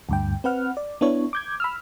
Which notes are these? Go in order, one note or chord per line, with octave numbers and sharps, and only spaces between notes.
D2 G2 G5
C4 B4 F#5 F6
D5
B3 D4 E4 C#5
D6 G6 G#6
B5 E6 F6